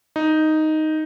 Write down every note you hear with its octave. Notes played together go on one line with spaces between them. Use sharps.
D#4